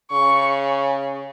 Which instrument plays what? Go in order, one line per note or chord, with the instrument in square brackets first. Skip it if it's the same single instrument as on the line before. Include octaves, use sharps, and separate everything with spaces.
[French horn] C#3 [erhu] C#6